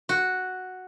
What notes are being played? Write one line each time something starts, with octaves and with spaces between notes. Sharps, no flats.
F#4